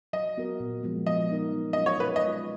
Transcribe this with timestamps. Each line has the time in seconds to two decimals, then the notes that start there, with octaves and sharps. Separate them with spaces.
0.13 F#3 D#5
0.37 B3 F#4 A#4
0.60 A#2
0.83 F3 G#3 B3
1.06 F3 D#5
1.30 B3 D#4 A#4
1.53 F#3
1.73 C#4 F4 A#4 D#5
1.86 C#5
2.00 B2 B4
2.16 D#5
2.23 G#3 C#4 F4